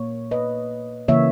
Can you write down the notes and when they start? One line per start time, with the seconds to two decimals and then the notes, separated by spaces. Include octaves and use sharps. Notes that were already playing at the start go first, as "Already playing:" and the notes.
Already playing: A#2 A#3 C#5
0.31 B4 D#5
1.08 C#3 E3 A#3 C#5 E5